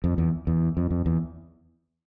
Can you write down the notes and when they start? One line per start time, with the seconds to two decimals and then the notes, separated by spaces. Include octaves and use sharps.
0.04 F2
0.18 E2
0.47 E2
0.77 F2
0.91 F2
1.06 E2